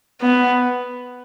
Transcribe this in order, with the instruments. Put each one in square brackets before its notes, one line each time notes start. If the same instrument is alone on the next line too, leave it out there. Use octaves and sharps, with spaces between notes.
[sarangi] B3